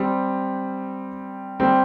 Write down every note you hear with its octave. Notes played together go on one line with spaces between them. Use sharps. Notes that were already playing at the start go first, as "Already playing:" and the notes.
Already playing: G3 C4
G3 C4